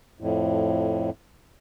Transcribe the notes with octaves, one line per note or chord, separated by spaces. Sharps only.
F2 A2